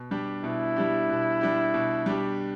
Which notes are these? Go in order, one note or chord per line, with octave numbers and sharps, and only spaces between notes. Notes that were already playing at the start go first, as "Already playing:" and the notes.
Already playing: B2
G3 D4 G4
B2 E4
G3 D4 G4
B2
G3 D4 G4
B2
G3 D4 G4